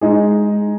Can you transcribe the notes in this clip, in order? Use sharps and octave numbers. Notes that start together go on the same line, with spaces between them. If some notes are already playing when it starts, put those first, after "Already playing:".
G#3 D#4 G#4